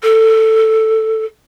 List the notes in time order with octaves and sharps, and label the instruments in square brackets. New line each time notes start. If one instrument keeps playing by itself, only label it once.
[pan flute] A4